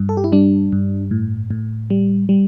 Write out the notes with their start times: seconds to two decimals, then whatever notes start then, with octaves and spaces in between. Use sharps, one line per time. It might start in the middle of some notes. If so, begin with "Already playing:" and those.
Already playing: G2
0.09 A4
0.17 G4
0.24 E4
0.32 G3 D4
0.72 G2
1.11 A2
1.51 A2
1.90 G3
2.29 G3